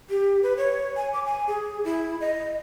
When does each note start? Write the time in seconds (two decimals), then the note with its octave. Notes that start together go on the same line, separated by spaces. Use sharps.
0.10 G4
0.43 B4
0.57 C#5
0.96 G#5
1.13 D6
1.25 G#5
1.48 G#4
1.84 E4
2.21 D#5